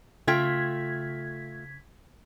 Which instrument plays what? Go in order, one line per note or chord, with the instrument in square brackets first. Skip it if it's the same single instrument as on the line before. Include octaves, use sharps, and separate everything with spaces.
[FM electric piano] C#3 G#6 B6 [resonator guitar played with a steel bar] A3 F4 G5